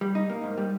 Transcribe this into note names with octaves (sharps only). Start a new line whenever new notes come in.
G3
D#4
A#3
G#2
G3